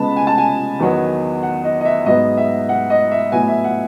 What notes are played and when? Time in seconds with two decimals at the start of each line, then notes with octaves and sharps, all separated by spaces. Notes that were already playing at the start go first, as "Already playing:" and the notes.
Already playing: C#3 G#3 B3 A5 B5
0.16 G#5
0.27 A5
0.38 G#5
0.79 E2 D#3 F#3 B3
1.43 F#5
1.64 D#5
1.81 D#5
1.85 E5
2.06 G#2 F#3 B3 D#5
2.37 E5
2.69 F#5
2.90 D#5
3.11 E5
3.32 A2 F#3 B3 G#5
3.48 E5
3.64 F#5